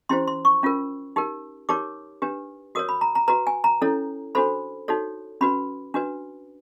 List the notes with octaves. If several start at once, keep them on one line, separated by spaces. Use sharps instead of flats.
C#4 E4 G4 C5 C6
C6
C#6
C#4 F4 A#4
D#4 G4 A#4
D#4 G4 A#4 C#5 D6
D4 G4 B4
F#4 A#4 C#5 D#6
B5
A#5
A#5
F#4 B4 A#5
G#5
A#5
C#4 E4 A4 C#5
D4 F#4 A4 C5 B5
D#4 F#4 A4 C#5
C#4 F#4 B4 B5
D4 F#4 B4